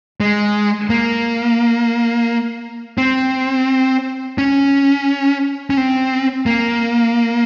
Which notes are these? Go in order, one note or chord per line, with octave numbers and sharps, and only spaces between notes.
G#3
A#3
C4
C#4
C#4
C4
A#3